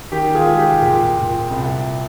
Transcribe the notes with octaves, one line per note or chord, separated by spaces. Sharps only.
D#3 G4
F4 G#4
G#3
G4
A#2 G4
A#2
C2